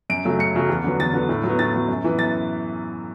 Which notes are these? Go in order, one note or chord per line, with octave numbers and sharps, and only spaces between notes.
F#2 D7
C#3 F#3 A3
F#2 C#7
C#3 F#3 A3
E2
D3 F#3 B3
E2 A6
D3 F#3 B3
A2
F#3
B3
A2 A6
F#3 B3
F#2
E3 B3
F#2 A6